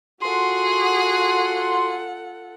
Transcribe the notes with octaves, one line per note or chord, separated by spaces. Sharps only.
F4 F#4 G#4 A4 F#5 C6